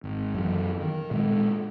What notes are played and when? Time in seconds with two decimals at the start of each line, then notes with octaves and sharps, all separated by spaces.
0.04 G#1
0.34 F#2 E3
0.81 D#3
1.11 A#2 G#3